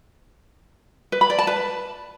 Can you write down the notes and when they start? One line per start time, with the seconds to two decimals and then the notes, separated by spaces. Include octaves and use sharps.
1.12 B4
1.21 B5
1.30 D5
1.38 A5
1.47 B4